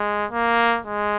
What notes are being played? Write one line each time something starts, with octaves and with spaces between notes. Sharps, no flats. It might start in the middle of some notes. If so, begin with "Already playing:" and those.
Already playing: G#3
A#3
G#3